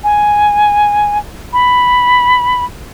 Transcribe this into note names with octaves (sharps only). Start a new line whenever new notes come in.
G#5
B5